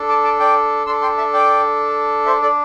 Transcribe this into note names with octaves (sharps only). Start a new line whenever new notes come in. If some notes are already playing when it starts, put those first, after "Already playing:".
Already playing: D4 A4
A5 D6
A5 D6
D5 G5
D4 A4 C6 E6
G5 C6
E5 A5
D5 G5
C5 E5
A4 D5